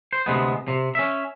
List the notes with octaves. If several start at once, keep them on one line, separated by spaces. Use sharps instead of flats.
C5
D2 C3 G#3 B3
C3
C#4 E5